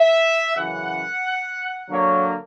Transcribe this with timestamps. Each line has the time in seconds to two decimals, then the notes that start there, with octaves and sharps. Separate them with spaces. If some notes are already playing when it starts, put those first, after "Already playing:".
Already playing: E5
0.55 F#2 C#3 E3 F#5
1.89 D3 F#3 A#3 C#5